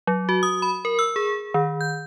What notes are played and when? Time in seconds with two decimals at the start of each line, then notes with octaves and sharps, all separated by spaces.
0.07 F#3
0.29 F#4
0.43 D#6
0.62 B5
0.85 A#4
0.99 E6
1.16 G#4
1.54 D#3
1.81 G6